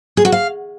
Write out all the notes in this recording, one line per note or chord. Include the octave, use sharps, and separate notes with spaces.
G#4
F#4
F5